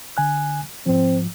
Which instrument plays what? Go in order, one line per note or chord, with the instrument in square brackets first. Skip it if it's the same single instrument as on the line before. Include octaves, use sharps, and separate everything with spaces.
[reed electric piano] D3 G#5 F#6
[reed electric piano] G#2 F3 [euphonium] C4